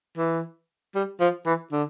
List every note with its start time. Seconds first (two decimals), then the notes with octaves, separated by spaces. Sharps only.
0.17 E3
0.95 G3
1.20 F3
1.46 E3
1.72 D3